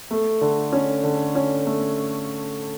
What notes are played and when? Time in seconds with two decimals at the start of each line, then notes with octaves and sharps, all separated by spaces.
0.11 A3
0.41 D3
0.72 C#4
1.03 D3
1.35 C#4
1.66 A3